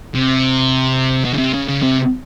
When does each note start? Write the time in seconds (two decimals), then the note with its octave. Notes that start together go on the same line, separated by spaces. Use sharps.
0.15 C3
1.25 B2
1.34 C#3
1.38 C3
1.54 C#3
1.68 C#3
1.83 C3